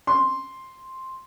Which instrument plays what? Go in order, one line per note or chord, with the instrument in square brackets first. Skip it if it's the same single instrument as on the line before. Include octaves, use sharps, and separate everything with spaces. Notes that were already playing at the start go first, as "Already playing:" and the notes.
[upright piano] C6